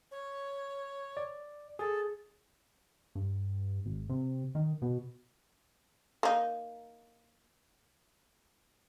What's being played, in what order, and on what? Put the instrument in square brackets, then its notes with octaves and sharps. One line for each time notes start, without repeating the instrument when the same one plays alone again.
[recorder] C#5
[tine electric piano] D5
[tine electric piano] G#4 [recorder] A4
[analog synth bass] G2
G#1
C3
D#3
B2
[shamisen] A#3 D#4